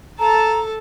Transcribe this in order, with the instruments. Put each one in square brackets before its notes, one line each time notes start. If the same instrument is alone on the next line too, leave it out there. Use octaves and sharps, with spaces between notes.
[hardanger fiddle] A4 A5 [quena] A#5